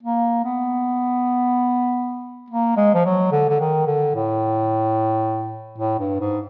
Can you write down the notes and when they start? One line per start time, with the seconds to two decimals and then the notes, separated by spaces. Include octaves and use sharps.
0.03 A#3
0.44 B3
2.50 A#3
2.77 G#3
2.94 F3
3.05 F#3
3.32 D3
3.49 D3
3.60 D#3
3.87 D3
4.15 A2
5.78 A2
5.99 G2
6.20 G#2